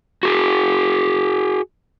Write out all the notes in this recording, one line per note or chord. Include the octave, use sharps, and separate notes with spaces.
F#4 G#4